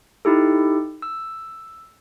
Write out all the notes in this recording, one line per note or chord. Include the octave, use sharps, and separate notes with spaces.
D#4 E4 G4 A4
E6